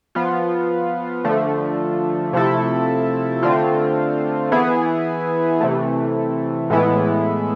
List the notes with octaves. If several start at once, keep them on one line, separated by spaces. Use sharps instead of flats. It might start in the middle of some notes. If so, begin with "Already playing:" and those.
F3 B3 F4
D3 F3 A3
C3 F3 A3 E4 A4
D3 A3 C4 F4
E3 B3 E4 G#4
C3 E3 A3
A2 E3 G#3 B3 E4